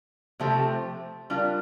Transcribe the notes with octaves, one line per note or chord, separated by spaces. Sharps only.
C3 F3 A3 C4 G4
G3 D4 F4 A#4